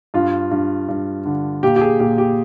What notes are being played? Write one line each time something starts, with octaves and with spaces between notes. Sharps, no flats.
G2 F4
G2
G2
D3
A#2 G4
G4
G#4
A#2 G4
G4